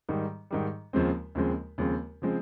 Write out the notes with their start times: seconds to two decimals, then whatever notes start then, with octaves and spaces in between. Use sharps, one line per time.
0.09 G#2 D#3 G3
0.51 G#2 D#3 G3
0.93 D#2 C#3 F3 G#3 C4
1.35 D#2 C#3 F3 G#3 C4
1.78 D#2 C#3 F3 G#3 C4
2.22 C#3 F3 G#3 C4